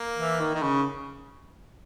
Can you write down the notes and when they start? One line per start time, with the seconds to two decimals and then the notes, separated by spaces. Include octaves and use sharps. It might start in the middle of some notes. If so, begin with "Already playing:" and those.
Already playing: A#3
0.17 E3
0.40 D#3
0.54 D#3
0.62 C#3